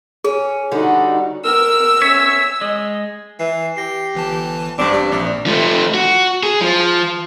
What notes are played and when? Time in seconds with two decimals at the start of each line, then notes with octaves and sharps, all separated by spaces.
0.24 C#4 G#4
0.72 D3 G3 D#4 F#4
1.45 A#4 E6
2.02 C#4 C#5 E5
2.61 G#3 D#5
3.40 E3 C7
3.77 G4 A#6 C7
4.15 G1 E3 A5
4.78 A1 G2 C4 D4
4.93 G3
5.12 A#1 D4
5.46 F3 A3
5.94 F#4
6.43 G#4
6.61 F3